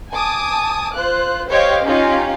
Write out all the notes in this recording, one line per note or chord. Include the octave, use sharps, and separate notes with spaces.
G#5 A5 D6 D#6
F4 C5 F#6
G4 C5 C#5 D#5 F5 G5
C#4 D#4 F4 G4 F5